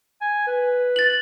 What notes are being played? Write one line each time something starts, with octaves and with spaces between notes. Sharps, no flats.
G#5
B4
A6 F#7